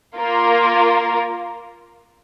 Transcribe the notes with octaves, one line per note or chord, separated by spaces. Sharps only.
A#3 F4 A#4